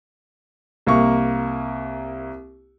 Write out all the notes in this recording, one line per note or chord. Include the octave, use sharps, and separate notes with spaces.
C2 A#3 C#6